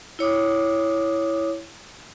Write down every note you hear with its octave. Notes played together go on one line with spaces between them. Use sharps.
E4 C#5 D6 D#6